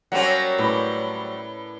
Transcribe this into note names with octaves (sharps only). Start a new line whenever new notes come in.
F#3 G3 A#3 C4 C#4 F#5
A2 B4 D5